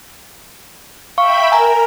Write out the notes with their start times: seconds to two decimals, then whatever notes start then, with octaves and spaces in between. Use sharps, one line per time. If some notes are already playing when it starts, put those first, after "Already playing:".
1.18 E5 F5 G5 B5 C#6
1.52 A#4 G#5 A#5